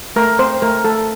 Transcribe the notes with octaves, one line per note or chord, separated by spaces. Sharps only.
A3 A#4
C4 C5
A3 A#4
A3 A4